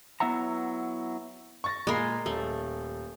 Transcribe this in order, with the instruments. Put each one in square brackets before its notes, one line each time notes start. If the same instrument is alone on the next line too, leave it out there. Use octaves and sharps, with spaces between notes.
[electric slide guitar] F#3 B3 E4 E5 F#5 A#5
[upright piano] C#6 A6 A#6
[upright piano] A#2 B5 C7 [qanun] G#3 A#4
[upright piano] D#1 [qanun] A3